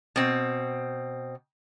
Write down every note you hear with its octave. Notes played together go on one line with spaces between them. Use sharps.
B2 C4